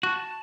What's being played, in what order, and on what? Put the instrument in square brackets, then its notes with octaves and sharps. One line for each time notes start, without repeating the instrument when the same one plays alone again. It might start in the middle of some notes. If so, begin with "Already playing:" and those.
[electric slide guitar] F#4 [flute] A5